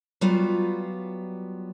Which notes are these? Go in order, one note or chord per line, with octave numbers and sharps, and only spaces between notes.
F#3 G3 B3 F4 F#4